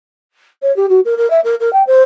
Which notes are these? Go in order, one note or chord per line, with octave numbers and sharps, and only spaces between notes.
C#5
G4
F#4
A#4
A#4
E5
A#4
A#4
G5
C5